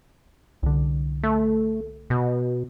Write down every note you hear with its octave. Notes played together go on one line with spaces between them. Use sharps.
C2 D3
A3
B2